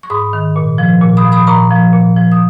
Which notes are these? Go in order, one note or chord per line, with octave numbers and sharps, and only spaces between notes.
C#6
G#2 B5 D#6
D#3
A#2
F3
A#2
B5 D#6
F3
B5 D#6
A#2 A#5 C#6
F3
A#2
F3
D#6